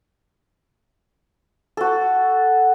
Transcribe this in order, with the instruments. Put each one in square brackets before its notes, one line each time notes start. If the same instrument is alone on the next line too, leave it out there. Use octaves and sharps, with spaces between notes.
[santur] F#4 A4